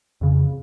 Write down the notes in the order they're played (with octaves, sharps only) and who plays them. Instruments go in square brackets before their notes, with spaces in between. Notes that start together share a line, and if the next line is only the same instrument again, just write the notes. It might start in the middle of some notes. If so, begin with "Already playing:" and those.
[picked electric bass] F2 C#3